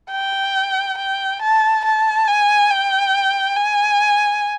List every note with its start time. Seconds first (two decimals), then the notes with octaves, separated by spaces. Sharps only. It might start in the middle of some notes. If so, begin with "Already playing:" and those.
0.12 G5
0.98 G5
1.42 A5
1.85 A5
2.28 G#5
2.71 G5
3.56 G#5